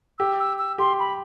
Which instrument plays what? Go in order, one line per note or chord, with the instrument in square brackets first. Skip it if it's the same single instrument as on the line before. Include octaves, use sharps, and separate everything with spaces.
[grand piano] G4 [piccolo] E6
[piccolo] E6
E6
[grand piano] G4 [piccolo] C6
[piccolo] B5